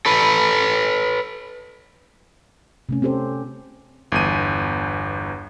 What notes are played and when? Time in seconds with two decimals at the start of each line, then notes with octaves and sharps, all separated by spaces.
0.06 A4 B4
2.89 C3 A3 C#4
3.02 C4 C#4 G4 A4 C5
4.12 G1 E2 D#7